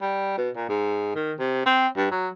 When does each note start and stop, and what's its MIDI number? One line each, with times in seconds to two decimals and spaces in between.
0.01 0.37 55
0.38 0.50 47
0.56 0.68 46
0.69 1.13 44
1.15 1.34 51
1.39 1.64 48
1.66 1.88 60
1.97 2.09 43
2.12 2.28 54